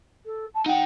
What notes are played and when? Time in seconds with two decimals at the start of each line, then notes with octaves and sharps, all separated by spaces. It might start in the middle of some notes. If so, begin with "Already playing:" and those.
0.25 A4
0.54 A5
0.66 D#4 F#5 G5